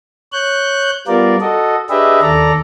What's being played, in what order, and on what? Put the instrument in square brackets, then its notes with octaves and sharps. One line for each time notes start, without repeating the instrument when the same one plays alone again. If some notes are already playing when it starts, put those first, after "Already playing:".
[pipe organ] C#5 F#6 G6
G3 B3 F4 A#4 D5
F#4 A4 D#5
D4 G4 G#4 B4 D#5 E5
D#2 A4 D5 A#5